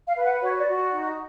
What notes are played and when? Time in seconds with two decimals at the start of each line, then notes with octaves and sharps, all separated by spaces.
0.08 F5
0.17 B4
0.25 F#5
0.42 F#4 C#5
0.58 D5
0.67 F#4
0.75 D5
0.92 D#4